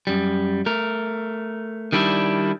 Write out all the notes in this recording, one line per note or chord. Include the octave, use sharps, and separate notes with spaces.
F#2 G3
A3 A#4
D#3 G3 D4 E4